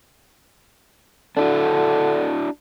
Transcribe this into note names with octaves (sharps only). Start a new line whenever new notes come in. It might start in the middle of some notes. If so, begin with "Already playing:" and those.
D3 D4 E4 F#4